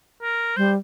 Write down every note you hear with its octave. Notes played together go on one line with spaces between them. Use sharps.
A#4
G3 C5